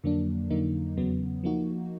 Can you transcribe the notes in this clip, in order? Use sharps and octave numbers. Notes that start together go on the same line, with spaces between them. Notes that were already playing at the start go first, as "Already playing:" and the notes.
F2 D3 F#3 A#3 D4
F2 D3 F#3 A#3 D#4
E2 C#3 F#3 B3
F3 A#3 D#4 F#4